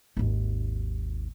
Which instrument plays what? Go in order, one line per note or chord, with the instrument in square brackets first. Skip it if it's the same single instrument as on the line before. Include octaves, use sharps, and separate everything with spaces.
[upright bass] G#1 D#2